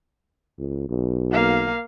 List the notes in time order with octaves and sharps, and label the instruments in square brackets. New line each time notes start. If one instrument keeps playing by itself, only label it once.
[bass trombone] C#2
B1
[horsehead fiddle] A#3 F5